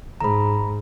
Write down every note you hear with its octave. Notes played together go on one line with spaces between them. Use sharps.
G#2 A#5 B5